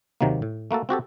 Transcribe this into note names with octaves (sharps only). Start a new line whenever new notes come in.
D#2 C3 D#3 F#3 A#3
A2
A3 A#3 F#4 A4
C4 F#4 G4 A4